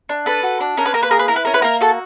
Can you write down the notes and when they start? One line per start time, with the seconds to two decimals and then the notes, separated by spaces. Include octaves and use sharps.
0.09 D4
0.26 A4 B4
0.43 F#4
0.60 D4
0.77 C#4 A#4
0.86 B4
0.94 A#3 A#4
1.03 B4
1.11 G#4 A#4
1.19 B4
1.28 E4 A#4
1.36 B4
1.45 C#4 A#4
1.54 B4
1.62 A#3 A#4
1.81 F#4 A4